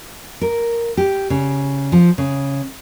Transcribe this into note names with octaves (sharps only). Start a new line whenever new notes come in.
A#4
G4
C#3
F3
C#3